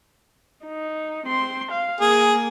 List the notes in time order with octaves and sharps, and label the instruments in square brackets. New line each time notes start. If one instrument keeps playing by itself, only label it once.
[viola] D#4
C4 C6
F5
[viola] A#3 [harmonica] G#4